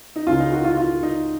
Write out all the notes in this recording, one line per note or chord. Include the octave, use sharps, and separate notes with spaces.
D#4
C#2 C#3 F4
D#4
F#4
F4
F4
D#4